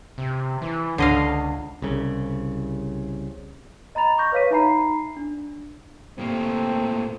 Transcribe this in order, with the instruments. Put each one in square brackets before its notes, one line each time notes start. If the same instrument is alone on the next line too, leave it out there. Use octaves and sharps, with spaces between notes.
[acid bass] C3
E3
[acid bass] C#2 [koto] D3 D#5 F5
[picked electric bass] C2 C#3
[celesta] D#5 A#5 B5 A6 F7
C#6 D6 G6 A#6
B4 C#5 F5 B6 D#7
D#4 E5 G#5 A#5 B5 C7
D4
[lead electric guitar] A2 A#3 [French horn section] C3 C4 A4